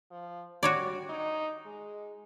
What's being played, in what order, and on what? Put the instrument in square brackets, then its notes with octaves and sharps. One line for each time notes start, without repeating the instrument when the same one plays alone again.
[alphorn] F3
[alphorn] G3 [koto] F#4 C#5 D5
[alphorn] D#4
G#3